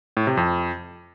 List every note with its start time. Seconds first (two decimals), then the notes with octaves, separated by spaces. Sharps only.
0.17 A2
0.27 C3
0.37 F2